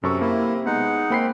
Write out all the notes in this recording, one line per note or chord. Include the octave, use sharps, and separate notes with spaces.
F#2 C3 A4 C#6
A#3 E4
G#3 B3 D#4 F#5
A#3 C4 B5 C7